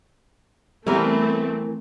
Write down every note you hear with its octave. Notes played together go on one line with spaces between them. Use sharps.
E3 G3 A3 B3 C4 A#4 B4